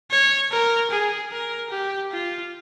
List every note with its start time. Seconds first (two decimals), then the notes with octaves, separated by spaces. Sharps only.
0.11 C#5
0.51 A#4
0.91 G#4
1.32 A#4
1.71 G4
2.12 F4